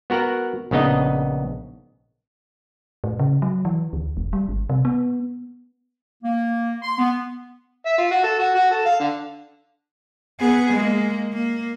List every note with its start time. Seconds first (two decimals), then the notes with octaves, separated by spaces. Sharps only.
0.10 B3 F#4 A#4 F#5 A#5
0.71 A#1 C#3 B3 D#4 D#5
3.04 A2
3.19 C#3
3.42 F#3
3.65 E3
3.93 D2
4.17 F1
4.33 G3
4.49 G#1
4.70 C3
4.85 B3
6.23 A#3
6.82 C6
6.98 B3
7.86 E5
7.98 F4
8.11 F#4
8.23 A4
8.39 F#4
8.55 F#4
8.71 A4
8.85 F5
9.00 D3
10.40 B3 G#4
10.73 G#3 A#3
11.33 A#3